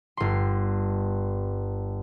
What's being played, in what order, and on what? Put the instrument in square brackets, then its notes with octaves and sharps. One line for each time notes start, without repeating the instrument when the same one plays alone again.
[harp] G1 C6